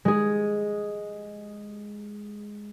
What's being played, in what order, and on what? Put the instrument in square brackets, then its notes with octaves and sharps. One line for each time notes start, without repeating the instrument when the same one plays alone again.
[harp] G#3 G#4